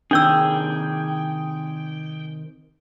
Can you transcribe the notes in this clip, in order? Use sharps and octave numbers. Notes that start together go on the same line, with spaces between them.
C3 D#3 D4 G#4 G5 E6